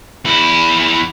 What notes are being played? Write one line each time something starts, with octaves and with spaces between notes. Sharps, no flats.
E2 E4